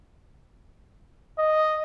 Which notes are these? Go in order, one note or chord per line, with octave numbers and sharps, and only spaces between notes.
D#5